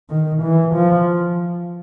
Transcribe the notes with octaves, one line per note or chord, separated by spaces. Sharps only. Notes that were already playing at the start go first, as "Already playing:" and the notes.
D#3
E3
F3